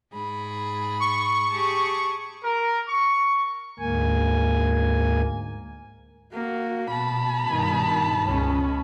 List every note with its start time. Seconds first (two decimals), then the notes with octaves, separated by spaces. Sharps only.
0.13 G#2 G#4 B5
1.00 C#6
1.51 G4 G#4 A5
2.43 A#4
2.87 C#6
3.79 D2 G#2 A#3 G#5
6.33 A#3 F#4
6.91 B2 A5 B5
7.47 G2 B2 D#3
8.26 C#2 G#3 C#4